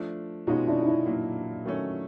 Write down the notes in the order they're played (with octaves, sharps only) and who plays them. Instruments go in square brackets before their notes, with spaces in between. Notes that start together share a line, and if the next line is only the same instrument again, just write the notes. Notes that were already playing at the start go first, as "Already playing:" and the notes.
Already playing: [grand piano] F3 A3 D4
[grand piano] B2 G#3 C#4 F#4 [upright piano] D#4 F4
[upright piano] D4 E4
D#4
D4 E4
[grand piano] A#2 F#3 A#3
D#3 F#3 A3 C#4